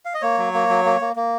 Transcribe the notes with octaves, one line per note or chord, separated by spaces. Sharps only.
F5
D#5
A#3 C#5
F#3
A#3
F#3
A#3
A#3
A#3